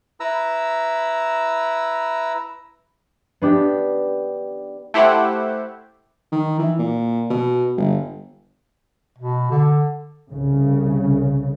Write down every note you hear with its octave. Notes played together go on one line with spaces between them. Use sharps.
E4 B4 A#5 E6
B3 D4 G4
A3 E4 G4 C5 F#5
D#3
E3
A#2
B2
G1
B2
D3
C2 C#3